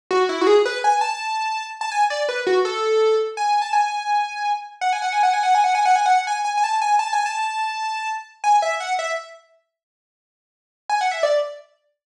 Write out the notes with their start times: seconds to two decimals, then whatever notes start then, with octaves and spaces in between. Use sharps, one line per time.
0.11 F#4
0.29 E4
0.41 F#4
0.47 G#4
0.65 B4
0.84 G#5
1.01 A5
1.81 A5
1.92 G#5
2.10 D5
2.29 B4
2.47 F#4
2.65 A4
3.37 G#5
3.62 A5
3.73 G#5
4.81 F#5
4.93 G#5
5.02 F#5
5.13 G#5
5.23 F#5
5.33 G#5
5.43 F#5
5.55 G#5
5.64 F#5
5.75 G#5
5.86 F#5
5.96 G#5
6.06 F#5
6.27 G#5
6.45 G#5
6.57 G#5
6.64 A5
6.82 G#5
6.99 A5
7.13 G#5
7.26 A5
8.44 G#5
8.62 E5
8.80 F#5
8.99 E5
10.89 G#5
11.01 F#5
11.12 E5
11.23 D5